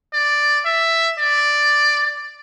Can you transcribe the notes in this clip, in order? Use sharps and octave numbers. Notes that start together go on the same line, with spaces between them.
D5
E5
D5